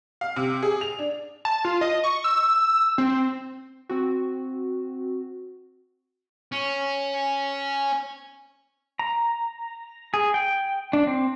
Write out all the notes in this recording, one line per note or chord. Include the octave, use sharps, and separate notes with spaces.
F5
C3
G#4
F7
D4
A5
F4
D#5
C#6
E6
C4
C4 F#4
C#4
A#5
G#4
G5
D4
C4